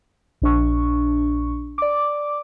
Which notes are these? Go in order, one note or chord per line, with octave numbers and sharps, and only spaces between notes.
A#1 D4 C#6
D5 D6